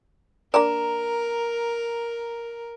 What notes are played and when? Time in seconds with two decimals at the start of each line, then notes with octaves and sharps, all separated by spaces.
0.54 A#3 D4 A#4 D5 A#5